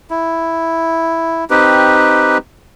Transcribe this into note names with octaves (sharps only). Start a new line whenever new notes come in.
E4
C4 D#4 G4 B4